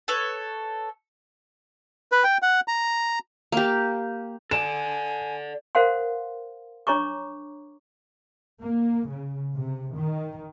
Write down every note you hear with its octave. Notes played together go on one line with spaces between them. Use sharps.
A4 B4 C#5
B4
G5
F#5
A#5
A#3 G4
A4 D5 G#5 E7
A#4 C5 F5 F#5 C6
D4 C#5 A#5 C#6 D6
A#3
C#3
C3
D#3